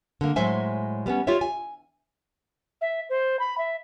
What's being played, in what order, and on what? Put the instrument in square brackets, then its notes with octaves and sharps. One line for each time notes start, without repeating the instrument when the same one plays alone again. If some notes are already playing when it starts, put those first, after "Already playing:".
[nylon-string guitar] D3 A#3
A2 F#3 G#3 C5 E5 G#5
G3 B3 C#4
F4 G4 C#5 E5
G#5
[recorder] E5
C5
B5
E5